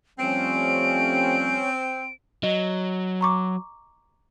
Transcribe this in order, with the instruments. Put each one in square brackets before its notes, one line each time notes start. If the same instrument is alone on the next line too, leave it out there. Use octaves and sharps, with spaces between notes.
[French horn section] F3 G3 A3 [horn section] C4 [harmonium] C#4 [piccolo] D7
[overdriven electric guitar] F#3 [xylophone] D#5
[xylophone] A#5 C#6 D6